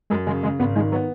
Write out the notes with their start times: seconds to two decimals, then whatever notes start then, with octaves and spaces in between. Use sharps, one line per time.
0.10 F#2 G#3
0.26 C#3 G#3
0.43 C#3 G#3
0.59 G#1 B3
0.75 D#3 G#3
0.92 F#3 B3